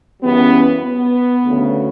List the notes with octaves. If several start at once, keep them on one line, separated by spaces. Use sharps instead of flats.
F#2 C#3 E3 G3 B3
B3
D2 C#3 F#3